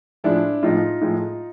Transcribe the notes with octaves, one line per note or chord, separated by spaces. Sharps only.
A2 F3 G#3 D4 E4
A2 F3 G#3 D#4 F4
A2 F3 G#3